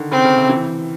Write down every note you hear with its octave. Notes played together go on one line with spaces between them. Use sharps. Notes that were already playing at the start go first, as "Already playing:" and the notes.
Already playing: D3 D#3
C#3 C4
C#3
C3
E3